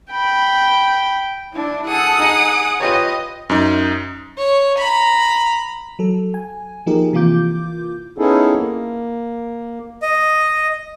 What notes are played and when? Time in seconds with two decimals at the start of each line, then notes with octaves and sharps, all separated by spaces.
0.12 G5 B5
1.53 D4 E4
1.87 G#4 A4 F#5 D#6
2.20 D#4 G#4
2.80 F4 G4 B4 C#5 D#5
3.50 F#2 D#4
4.38 C#5
4.79 A#5 B5
5.99 F#3 A4
6.34 G#5
6.86 F3 A#3 D#4 G4 G#4 A#4
7.13 C3 E3 A#3 F4 D6 G6
8.18 B3 C#4 D#4 E4 G#4 A4
8.54 A#3
10.02 D#5